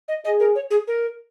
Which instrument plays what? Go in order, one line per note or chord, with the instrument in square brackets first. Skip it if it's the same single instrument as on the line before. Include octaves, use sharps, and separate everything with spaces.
[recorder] D#5
[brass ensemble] G#4 [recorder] D#5
[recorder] A#4
C#5
G#4
A#4